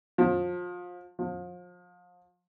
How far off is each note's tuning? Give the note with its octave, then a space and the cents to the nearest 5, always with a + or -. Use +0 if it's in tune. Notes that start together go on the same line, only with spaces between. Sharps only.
F3 +30
F3 +35